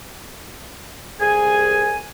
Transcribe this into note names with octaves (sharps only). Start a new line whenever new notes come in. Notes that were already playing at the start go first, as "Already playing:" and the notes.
C2 G#4 G#5